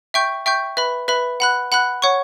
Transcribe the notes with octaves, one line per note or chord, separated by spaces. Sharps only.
E5 G5 C#6 G6
E5 G5 C#6 G6
B4 E5 B5
B4 E5 B5
F#5 B5 F#6
F#5 B5 F#6
C#5 F#5 C#6